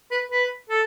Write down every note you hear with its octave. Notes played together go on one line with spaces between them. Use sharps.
B4
B4
A4